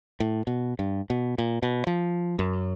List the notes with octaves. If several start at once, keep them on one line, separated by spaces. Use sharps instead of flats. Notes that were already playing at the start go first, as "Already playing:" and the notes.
A2
B2
G2
B2
A#2
B2
F3
F#2